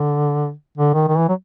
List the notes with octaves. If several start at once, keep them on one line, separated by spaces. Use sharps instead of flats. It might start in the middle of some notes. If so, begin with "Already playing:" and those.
Already playing: D3
D3
D#3
D#3
E3
F#3